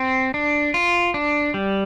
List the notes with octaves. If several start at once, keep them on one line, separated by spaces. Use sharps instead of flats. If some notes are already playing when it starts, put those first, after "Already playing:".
Already playing: C4
D4
F4
D4
G3